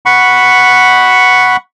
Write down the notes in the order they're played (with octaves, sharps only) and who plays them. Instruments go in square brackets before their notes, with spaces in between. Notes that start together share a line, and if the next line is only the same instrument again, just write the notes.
[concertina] F#5 B5 C#6